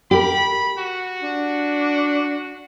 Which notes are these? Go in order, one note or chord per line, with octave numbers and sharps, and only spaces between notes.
G4 A#4 B5
F#4
D4